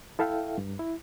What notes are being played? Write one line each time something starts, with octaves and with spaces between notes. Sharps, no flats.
E4 A4 E5 F5 G5
G2
E4